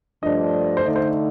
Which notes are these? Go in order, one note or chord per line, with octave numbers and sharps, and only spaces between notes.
G2 F3 A3 D4 D#5
C5
D3 A3 D#4 D5
C5